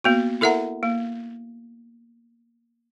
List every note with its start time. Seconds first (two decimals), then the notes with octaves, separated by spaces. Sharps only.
0.04 A#3 B3 F#4
0.41 E4 A4 A#4 E5 F#5 A#5
0.83 A#3